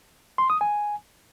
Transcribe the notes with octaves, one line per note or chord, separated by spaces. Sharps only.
C6
D#6
G#5